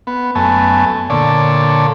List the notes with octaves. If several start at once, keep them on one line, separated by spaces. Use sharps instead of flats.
B3
F#2 A3 B3 G#5 A5
A#2 D3 A4 C#5 D5